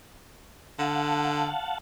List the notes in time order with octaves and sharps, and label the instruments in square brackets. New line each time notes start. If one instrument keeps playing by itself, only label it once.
[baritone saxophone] D3 [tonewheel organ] F5 F#5 A5